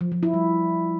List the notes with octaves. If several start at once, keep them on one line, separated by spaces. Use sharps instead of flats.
F3
F3
E4
G3